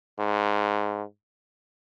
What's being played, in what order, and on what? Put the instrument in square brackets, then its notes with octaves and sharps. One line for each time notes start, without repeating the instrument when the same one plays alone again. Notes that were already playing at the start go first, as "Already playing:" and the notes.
[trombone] G#2